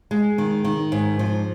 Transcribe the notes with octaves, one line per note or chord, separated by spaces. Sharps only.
G#3
D#3
D#3
G#2
F3